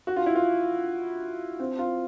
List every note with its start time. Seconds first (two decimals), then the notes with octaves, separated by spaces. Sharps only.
0.07 F#4
0.16 F4
0.26 E4
0.35 F4
1.60 C4
1.79 F4